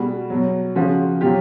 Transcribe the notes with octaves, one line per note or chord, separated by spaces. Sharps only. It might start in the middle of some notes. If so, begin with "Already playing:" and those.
Already playing: B2 G3 F#4 G#4
B2 F#3
C#3 F3 F#4 G#4
B2 F#3 F4 G4